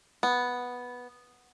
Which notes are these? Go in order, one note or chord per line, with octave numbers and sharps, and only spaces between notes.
B3